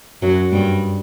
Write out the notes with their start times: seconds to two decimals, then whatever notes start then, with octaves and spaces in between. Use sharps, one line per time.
0.22 F#2 F#3
0.52 G2 G3